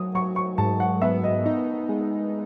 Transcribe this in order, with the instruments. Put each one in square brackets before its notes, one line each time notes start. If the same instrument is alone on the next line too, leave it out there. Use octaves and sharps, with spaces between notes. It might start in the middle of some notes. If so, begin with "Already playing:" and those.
Already playing: [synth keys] F#3 [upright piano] D#6
[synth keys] F#3 [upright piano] C#6
[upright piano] C#6
[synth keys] G#2 [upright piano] A5
[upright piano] F#5
[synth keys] B3 [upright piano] E5
[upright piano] D#5
[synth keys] D#4
G#3